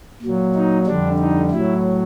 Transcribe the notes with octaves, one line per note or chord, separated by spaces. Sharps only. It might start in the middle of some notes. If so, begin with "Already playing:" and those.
A#2 F#3
D#4
F2 D3 G3 D4
D#4
A2 F#3 E4